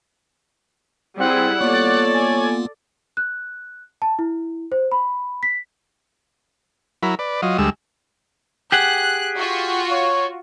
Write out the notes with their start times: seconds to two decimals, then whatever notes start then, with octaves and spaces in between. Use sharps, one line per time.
1.19 G3 C4 E4 G#4 F#5
1.61 A#3 B3 F4 A4 C#5 D5
2.13 G#5
3.17 F#6
4.02 A5
4.19 E4
4.72 C5
4.92 B5
5.43 B6
7.03 F#3 E4 A#4 B5
7.19 B4 D5
7.42 F#3 F4 D#5
7.58 D2 G3 G#3 E6
8.72 G4 G#4 F#5 F#6
9.37 F4 F#4
9.91 C#5